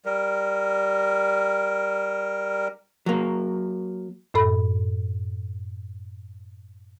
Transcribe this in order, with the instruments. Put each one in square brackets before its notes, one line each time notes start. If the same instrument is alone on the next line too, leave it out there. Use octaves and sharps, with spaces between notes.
[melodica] G3 A#4
[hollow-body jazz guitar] F#3 A#3
[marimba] F#2 A2 A4 B5